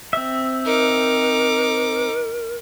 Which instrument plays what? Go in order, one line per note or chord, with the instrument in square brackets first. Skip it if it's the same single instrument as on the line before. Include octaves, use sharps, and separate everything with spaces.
[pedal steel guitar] C4 E5
[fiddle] D#4 D6 [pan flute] A#4